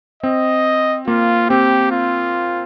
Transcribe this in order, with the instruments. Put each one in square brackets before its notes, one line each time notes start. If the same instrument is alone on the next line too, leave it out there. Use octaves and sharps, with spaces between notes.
[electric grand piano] C4 [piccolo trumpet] D#5
[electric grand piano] A#3 [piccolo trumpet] F4
[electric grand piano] C4 [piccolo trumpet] G4
[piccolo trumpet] F4